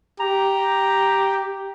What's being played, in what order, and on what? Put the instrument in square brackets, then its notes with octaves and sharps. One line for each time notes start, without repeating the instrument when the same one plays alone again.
[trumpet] G4 [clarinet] A#5